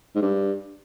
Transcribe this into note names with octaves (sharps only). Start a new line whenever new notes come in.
G#2
G2